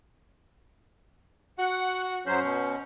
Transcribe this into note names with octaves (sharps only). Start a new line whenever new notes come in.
F#4 F#5
F#2 F#3 C#4 C5
B2